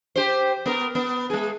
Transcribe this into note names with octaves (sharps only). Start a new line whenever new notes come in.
G4 C5
B3 A#4
B3
G#3 G#4